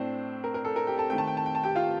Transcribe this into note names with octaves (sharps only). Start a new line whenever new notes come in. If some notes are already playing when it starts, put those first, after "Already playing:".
Already playing: A2 A3 C4 D4 C5
A#4
A#4
A4
A#4
G4 G5
A4 A5
D#3 A3 C4 G5
A5
G5
A5
G5
A5
G4 G5
F4 F5